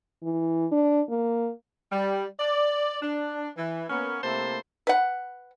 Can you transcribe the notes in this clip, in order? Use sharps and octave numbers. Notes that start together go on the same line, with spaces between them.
E3
D4
A#3
G3
D5
D4
E3
A#3 B3 C#4
C3 A3 A#3 E4 C5 A5
B4 F#5